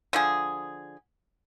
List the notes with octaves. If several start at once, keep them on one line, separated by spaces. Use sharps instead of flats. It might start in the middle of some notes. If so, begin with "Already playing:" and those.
D3 F3 G#4